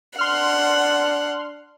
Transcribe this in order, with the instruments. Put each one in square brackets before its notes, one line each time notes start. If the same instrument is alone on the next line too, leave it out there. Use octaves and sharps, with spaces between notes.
[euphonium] D4 [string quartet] F#5 [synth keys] C6 F6